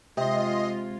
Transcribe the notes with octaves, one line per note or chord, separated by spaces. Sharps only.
C3 G#3 F4 D#5 C6